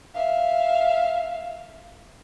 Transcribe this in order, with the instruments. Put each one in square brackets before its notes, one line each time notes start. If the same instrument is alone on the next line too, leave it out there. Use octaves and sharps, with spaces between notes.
[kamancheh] E5 F5